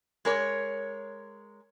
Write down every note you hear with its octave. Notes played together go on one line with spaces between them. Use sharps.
G#3 A#4 C#5